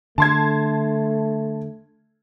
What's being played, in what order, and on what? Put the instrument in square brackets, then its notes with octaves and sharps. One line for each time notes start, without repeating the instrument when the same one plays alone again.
[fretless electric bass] D3 [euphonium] A3 [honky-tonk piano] A5 C6 G#6